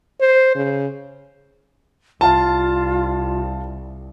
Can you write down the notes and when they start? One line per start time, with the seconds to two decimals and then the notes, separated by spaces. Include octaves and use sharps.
0.21 C5
0.55 C#3
2.21 C2 F4 F5 A5